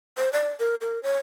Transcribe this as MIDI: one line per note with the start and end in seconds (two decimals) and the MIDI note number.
0.17 0.32 72
0.33 0.49 74
0.60 0.75 70
0.81 1.01 70
1.03 1.18 73